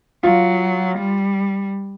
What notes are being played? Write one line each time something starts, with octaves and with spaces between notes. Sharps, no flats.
F#3 F4
G3